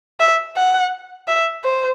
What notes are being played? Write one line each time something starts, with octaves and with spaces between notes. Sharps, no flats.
E5
F#5
E5
C5